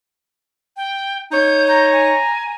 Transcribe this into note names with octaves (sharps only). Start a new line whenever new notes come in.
G5
D#4 C#5 G6
A#5 G6
G#5